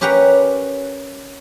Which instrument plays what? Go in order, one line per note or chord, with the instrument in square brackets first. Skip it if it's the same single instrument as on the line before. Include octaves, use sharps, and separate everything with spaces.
[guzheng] C#4 G4 A#4 B4 F#5 A#5